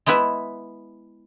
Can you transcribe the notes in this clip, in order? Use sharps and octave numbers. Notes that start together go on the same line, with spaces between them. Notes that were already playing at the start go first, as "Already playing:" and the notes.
G#3 B3 E4 B4 E5